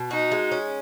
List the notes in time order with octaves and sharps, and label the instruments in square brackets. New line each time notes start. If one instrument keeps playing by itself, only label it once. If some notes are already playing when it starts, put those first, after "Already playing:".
Already playing: [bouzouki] B2
[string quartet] D#4 [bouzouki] F#4
[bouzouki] G#3
C#4